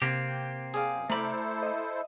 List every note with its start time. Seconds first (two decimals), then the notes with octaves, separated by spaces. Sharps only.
0.02 C3 A#3 C4 G4
0.74 G#4 D5 F5
0.93 F#2
1.10 A3 E4 A4 A#4 C5 D5 B5
1.63 D#5 E5